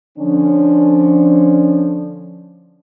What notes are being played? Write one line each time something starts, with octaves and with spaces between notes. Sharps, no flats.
D3 F3 C#4 D4